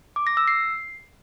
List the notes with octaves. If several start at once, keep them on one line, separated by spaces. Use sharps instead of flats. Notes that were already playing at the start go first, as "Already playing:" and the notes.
D6
A#6
E6
C7